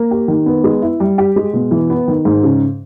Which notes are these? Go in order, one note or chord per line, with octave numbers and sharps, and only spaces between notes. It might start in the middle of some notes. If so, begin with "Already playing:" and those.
Already playing: A#3
G4
D#3
B3
G#3
E4
G3
G4
G#3
B2
E3
B3
D#3
G#2
C#3